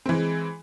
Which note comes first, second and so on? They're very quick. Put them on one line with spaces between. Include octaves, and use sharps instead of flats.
C4 E3 G#3